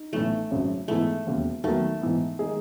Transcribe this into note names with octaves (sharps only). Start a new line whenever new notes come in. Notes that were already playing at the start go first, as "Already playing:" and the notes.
Already playing: D#4
A1 A2 E3 A3 B3
G#1 F#2 C#3
G#2 E3 A3 B3 E4 G#4
E1 D#2 C#3
D#2 D#3 F#3 A3 B3
G#2 E3 B3
D#3 G#3 D#4 G#4